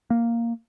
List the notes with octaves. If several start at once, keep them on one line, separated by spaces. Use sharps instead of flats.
A#3